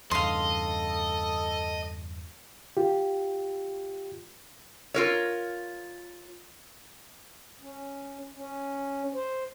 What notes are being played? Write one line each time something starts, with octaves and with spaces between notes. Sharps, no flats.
E2 G2 C#3 A4 D#5 F5 C6
F4 G4
F4 A#4 C#5
C#4
C#4
C5